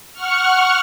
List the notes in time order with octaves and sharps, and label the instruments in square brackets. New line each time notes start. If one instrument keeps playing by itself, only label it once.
[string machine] F#5 C#6 F6